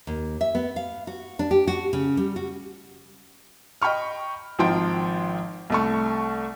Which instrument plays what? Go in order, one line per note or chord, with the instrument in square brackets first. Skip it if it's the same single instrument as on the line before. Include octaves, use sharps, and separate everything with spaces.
[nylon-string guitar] D#2
E5
B3
F5
F#4
D4
G4
F#4
C#3
G3
F#4
[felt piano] D#5 G5 B5 C#6 F6
G#1 D#3 F3 G5 C6 D7
C2 A3 C#6